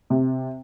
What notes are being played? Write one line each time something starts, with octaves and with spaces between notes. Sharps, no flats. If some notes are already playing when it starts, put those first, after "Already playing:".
C3